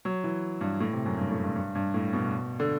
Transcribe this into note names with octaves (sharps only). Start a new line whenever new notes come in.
F#3
E3
G2
A2
C3
F#2
G2
A2
G2
G2
G2
A2
B2
D3